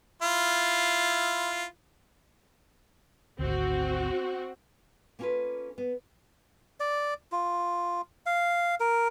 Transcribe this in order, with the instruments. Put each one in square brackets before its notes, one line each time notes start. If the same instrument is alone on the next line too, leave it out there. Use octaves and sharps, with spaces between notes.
[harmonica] E4 F4
[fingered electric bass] G#1 D2 [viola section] C4 F#4
[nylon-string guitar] A#3 B3 C#4 F4 A4 B4
B3
[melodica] D5
F4
F5
A#4